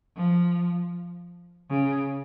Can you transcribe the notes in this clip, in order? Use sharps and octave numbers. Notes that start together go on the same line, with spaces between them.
F3
C#3